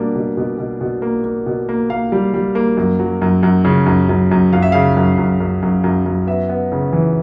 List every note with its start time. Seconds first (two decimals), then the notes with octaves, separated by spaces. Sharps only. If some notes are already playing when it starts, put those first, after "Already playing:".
Already playing: B2 G3 A#3 D4
0.16 B2
0.37 B2
0.58 B2
0.81 B2
1.02 A#3
1.24 A#3
1.46 B2
1.69 A#3
1.90 A#3 F5
2.12 G3
2.34 G3
2.55 A#3
2.77 F#2
2.99 F#3
3.22 F#2
3.43 F#2
3.65 C#3
3.86 F#2
4.09 F#2
4.31 F#2
4.53 F#2 F5
4.62 E5
4.72 C#3 F5
4.97 F#2
5.18 F#2
5.40 F#2
5.62 F#2
5.84 F#2
6.06 F#2
6.27 B3 E5
6.49 B3
6.72 C#3
6.93 E3